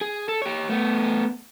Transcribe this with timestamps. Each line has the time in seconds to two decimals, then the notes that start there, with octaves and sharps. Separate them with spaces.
0.01 G#4
0.29 A4
0.42 G4 C#5
0.69 A3 B3